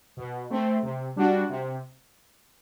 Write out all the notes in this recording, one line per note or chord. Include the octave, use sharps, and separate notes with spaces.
B2
A3 C4
C3
G3 D4 F#4
C3